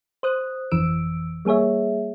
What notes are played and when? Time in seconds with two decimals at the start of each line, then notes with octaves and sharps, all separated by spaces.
0.23 C5 D#6 F#6
0.71 G1 F2 E3 E6 D7
1.45 G3 A#3 G#4 C#5 E5